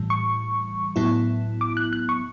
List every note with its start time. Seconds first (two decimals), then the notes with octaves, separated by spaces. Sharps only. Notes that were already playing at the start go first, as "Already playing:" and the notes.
Already playing: A2 E3 G3
0.10 C#6
0.96 A2 F#3 B3 E4
1.61 D6
1.77 F#6
1.93 F#6
2.09 C#6